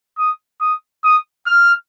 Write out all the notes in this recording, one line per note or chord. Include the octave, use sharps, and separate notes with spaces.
D#6
D#6
D#6
F6